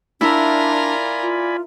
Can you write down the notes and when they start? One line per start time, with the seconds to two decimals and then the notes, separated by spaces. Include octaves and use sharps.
0.21 D4 E4 F4 A#4 D5 G#5 B5
1.22 F4